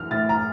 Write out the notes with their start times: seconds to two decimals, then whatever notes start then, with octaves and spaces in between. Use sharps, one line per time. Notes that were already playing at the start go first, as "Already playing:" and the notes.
Already playing: E3 F6
0.10 A2 A6
0.29 A#5